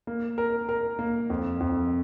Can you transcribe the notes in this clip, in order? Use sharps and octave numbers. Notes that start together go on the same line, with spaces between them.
A#3
A#4
A#4
A#3
F2
F2